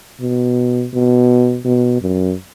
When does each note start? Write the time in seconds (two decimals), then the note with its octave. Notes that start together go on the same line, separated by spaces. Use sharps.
0.21 B2
0.94 B2
1.65 B2
2.01 F#2